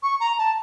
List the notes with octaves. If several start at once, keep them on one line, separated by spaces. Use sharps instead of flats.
C#6
A#5
A5